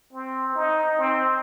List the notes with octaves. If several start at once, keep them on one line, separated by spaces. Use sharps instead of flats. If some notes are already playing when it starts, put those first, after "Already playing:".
C4
D#4
C4